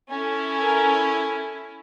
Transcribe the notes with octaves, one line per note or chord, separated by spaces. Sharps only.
C#4 E4 A4
A#4